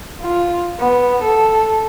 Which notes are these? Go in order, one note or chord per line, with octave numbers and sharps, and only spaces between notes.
F4
B3
A4